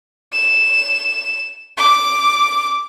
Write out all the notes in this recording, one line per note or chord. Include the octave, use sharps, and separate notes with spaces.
E7
D6